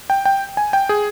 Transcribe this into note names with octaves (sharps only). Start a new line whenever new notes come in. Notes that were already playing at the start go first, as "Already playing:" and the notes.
G5
G5
G#5
G5
G#4